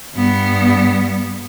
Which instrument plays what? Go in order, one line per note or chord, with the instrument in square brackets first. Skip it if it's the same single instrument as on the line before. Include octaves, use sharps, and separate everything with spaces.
[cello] G2 B3